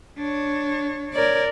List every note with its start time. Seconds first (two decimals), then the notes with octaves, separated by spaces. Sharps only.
0.18 D4 C#5
1.14 A#4 C#5 D5